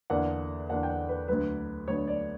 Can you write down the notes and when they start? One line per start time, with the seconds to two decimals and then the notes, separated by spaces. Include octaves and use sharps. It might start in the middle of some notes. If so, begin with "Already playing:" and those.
0.10 E2 D3 A#3 D4 F#5
0.69 E2 D3 A#3 D4 F#5
0.83 G5
0.89 F#5
1.09 B4
1.28 D2 D3 F#3 B3 B4
1.88 D2 D3 F#3 B3 C#5
2.08 D5